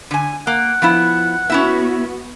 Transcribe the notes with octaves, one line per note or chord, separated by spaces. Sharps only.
D3 G#5
A#3 F#5
F3 B3 E4
B3 C#4 E4 F#4 E5